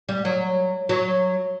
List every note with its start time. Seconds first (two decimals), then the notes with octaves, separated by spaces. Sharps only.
0.09 G3
0.25 F#3
0.89 F#3